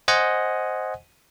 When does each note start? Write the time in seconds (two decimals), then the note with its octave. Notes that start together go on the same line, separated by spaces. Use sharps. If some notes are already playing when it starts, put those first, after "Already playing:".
0.08 C5 D#5 F#5 G#5